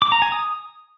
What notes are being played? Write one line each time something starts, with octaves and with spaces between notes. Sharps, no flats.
D6
A#5
G#5
D#6